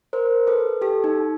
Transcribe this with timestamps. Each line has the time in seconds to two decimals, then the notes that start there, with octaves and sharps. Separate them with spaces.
0.13 A#4 C5
0.47 A4 B4
0.81 G4 A4
1.04 D#4